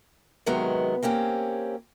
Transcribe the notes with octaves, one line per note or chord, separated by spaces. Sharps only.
C3 D#3 F#3 G#3 B3
A#3 C4 C#4 G4